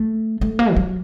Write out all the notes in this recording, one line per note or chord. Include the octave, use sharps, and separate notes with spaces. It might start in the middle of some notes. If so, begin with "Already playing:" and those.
Already playing: A3
A3
A#3
D#3
F#3